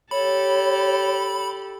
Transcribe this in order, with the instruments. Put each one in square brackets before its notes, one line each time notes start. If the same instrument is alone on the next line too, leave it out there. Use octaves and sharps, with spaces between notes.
[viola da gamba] G4 A4 [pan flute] C#5 [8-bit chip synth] B5